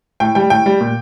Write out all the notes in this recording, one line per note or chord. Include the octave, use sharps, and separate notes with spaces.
A2 G5
G3 G5
A2 G5
G3
A#2